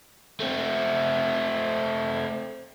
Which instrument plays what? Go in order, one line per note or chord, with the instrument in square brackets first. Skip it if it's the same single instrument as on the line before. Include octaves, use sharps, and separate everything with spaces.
[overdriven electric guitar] A3 C4